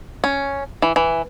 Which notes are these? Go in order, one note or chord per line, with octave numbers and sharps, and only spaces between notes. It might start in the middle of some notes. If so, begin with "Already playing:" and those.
C#4
E3
E3